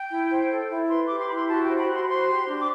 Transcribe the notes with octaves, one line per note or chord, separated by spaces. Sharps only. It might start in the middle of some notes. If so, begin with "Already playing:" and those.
Already playing: G5
E4
C5
A4
E4
B4 C6
D6
G4
C6
E4 B5
C6
F#4 A5
G5
C5
B5
F#4
C6
B5
C5 C6
G4
D4
D6